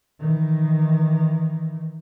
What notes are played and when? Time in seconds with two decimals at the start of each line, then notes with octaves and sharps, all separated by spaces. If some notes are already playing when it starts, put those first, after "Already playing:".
0.19 D#3 E3